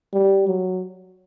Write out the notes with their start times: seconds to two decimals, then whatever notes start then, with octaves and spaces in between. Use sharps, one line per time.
0.13 G3
0.48 F#3